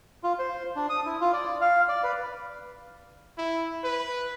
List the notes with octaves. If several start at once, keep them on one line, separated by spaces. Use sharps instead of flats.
F4
C5
D4
D#6
E4
F4
D5
D5
F5
D5
B4
E4
B4